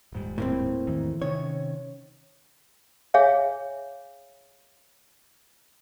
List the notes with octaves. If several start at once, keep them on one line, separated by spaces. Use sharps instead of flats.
D#1 G#2 G3
A2 A#3 C4
E2 D#3 E3
C3 D#3 C#4 C#5
G#4 C#5 E5 F5 G#5